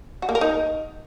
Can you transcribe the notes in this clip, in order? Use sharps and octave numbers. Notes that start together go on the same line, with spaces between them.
F#4
A#3
A#4
D#4